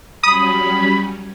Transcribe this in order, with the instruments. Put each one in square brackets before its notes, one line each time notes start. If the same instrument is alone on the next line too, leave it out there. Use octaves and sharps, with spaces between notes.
[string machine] F#3 G3 C#4 [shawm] B5 [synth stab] D#6